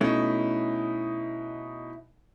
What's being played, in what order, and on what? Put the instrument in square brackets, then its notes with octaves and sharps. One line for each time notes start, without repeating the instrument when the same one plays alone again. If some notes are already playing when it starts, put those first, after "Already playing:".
[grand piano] B2 D#4 [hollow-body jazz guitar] A3 C#4 E4